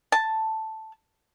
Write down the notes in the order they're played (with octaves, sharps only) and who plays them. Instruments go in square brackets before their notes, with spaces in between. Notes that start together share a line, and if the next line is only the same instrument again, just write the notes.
[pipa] A5